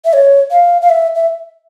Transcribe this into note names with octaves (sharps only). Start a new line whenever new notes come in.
E5
C#5
F5
F5
E5
E5